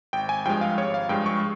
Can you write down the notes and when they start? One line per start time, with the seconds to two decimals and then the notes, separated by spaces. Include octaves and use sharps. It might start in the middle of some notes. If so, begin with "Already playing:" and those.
0.13 G#1 G5
0.29 G#5
0.45 G2 F3 G#3 G5
0.61 F5
0.78 G#1 C#5
0.94 F5
1.09 G2 F3 G#3 G5
1.26 C#6